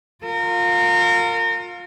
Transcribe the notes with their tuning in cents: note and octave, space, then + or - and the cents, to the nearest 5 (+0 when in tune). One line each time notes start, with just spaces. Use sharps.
F4 +20 A#4 -30